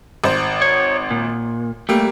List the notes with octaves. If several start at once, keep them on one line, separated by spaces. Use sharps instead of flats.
G#1 C5
C#5
A#2
G3 A3 A#3 G4